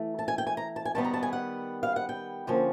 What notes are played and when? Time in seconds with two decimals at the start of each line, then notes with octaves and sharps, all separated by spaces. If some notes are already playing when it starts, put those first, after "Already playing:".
Already playing: E3 A3
0.19 A5
0.28 G#5
0.38 G5
0.47 G#5
0.57 A#5
0.76 A5
0.85 G#5
0.95 D#3 G3 B3 A5
1.05 A#5
1.14 A5
1.23 G#5
1.33 F#5
1.83 F5
1.96 F#5
2.09 G5
2.47 D3 F3 A#3 C#4